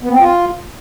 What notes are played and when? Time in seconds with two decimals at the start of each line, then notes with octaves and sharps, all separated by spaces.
0.03 B3
0.12 C4
0.20 F4